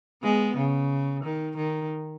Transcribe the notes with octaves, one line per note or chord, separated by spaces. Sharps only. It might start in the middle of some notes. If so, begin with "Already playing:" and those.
G#3 B3
C#3
D#3
D#3